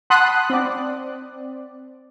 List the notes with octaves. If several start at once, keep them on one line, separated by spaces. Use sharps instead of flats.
F#5 A5 B5 C6 D#6 F#6
C4 D5